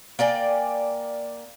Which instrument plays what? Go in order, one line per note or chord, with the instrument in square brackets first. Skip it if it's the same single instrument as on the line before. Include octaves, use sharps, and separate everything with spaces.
[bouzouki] A#3 D5 G5 G#5